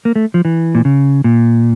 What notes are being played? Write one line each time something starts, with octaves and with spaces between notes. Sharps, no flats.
A#3
A3
F3
E3
A#2
C#3
A#2